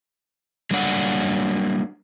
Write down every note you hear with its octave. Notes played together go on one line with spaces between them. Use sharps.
F#3 G3 A#3 D4 D5 F#5